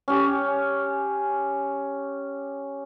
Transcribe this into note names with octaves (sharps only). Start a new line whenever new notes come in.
C#4 G4